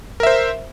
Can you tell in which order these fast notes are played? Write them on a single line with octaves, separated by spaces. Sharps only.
A#4 E5 C5